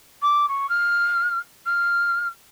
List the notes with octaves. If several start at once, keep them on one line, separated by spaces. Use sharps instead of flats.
D6
C#6
F6
F6